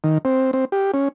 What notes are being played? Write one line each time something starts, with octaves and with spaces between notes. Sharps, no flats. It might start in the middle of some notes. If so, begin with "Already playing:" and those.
D#3
C4
C4
G4
C#4